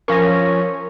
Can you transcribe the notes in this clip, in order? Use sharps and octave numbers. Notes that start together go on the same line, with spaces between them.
F3 C#4 A#4 C#6 A#6